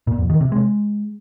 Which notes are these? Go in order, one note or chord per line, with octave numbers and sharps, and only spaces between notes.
A#2
F2
D#3
C3
G#3